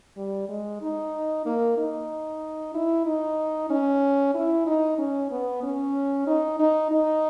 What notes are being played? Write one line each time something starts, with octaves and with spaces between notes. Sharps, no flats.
G3
G#3
D#4
A#3
D#4
E4
D#4
C#4
E4
D#4
C#4
B3
C#4
D#4
D#4
D#4